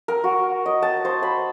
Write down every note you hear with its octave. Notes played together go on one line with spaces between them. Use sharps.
A#4
F#4
D#5
A5
C5
B5